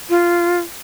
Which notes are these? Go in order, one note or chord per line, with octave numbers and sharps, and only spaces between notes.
F4